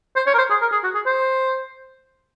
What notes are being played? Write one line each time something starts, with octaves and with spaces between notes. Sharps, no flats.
C5
C#5
A#4
C5
G#4
A#4
G#4
F#4
G#4
C5